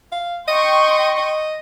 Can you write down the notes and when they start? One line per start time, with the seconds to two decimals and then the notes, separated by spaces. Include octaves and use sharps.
0.12 F5
0.48 D#5 G5 C6 C#6
1.18 D#5